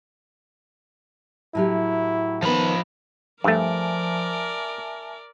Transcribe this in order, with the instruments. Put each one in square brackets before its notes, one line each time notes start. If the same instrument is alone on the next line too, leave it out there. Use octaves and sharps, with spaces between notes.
[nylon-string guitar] A2 F#3 G4 [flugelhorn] E4
[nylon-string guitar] D#3 B3 [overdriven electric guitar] F3 B5
[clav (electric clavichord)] G2 A3 [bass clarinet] F3 [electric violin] A#4 D5 [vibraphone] E5 G#5 A5